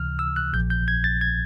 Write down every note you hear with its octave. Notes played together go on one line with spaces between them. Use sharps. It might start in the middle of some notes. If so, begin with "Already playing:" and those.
Already playing: C#2 C3 E3 F6
E6
F#6
A#1 A#2 F3 G6
G6
G#6
A6
G#6